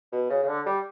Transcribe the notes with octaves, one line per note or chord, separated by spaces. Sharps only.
B2
C#3
C#3
D3
G3